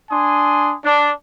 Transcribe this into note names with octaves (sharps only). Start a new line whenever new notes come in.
D4 G#5 C6 D#6
D4